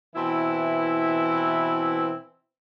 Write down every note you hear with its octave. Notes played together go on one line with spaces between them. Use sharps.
B2 E3 C4 E4